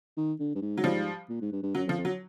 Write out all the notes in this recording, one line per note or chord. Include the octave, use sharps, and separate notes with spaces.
D#3
D3
G2
G#2
F#3
F3 G3
A#2
G#2
G2
G2
F#2 F#3
F2
F3
F2
F#3